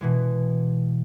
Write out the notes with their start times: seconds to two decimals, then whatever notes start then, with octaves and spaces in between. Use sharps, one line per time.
0.01 B2 E3 G#3